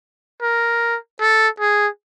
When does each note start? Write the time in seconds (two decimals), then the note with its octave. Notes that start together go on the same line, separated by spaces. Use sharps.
0.42 A#4
1.21 A4
1.60 G#4